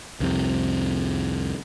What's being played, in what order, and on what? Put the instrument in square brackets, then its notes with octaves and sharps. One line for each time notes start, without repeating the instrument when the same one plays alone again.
[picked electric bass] C2 F2 C3